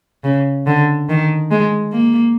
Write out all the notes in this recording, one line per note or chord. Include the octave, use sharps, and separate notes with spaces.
C#3
D3
D#3
G#3
A#3